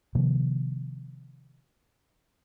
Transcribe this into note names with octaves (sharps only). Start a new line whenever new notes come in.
C3 D#3 F3 A#3